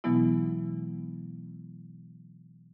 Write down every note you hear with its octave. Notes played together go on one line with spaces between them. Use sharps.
B2 E3 F#3 G#3 B3 E4